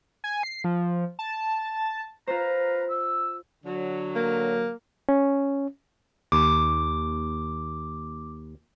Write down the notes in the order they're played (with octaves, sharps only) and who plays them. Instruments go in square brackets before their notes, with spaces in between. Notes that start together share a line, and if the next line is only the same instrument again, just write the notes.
[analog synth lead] G#5
C7
F3
A5
[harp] F4 C5 [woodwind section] B4 F5 A#5
[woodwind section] E6
[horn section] D3 F#3
[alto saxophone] A#3
[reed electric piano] C#4
[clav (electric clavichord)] D#2 [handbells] D6